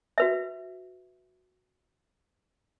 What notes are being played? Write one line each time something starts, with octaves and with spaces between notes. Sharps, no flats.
F#4 B4 E5